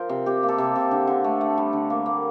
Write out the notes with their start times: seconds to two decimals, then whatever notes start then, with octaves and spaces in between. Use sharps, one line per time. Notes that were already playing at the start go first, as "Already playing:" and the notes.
Already playing: F3 A#4 C5
0.09 C3
0.26 C3 G4
0.43 A#3
0.49 A4
0.58 C3
0.76 C3
0.91 D3
1.07 D3
1.24 A3
1.41 A3
1.58 G3
1.73 D3
1.90 A#3
2.06 A#3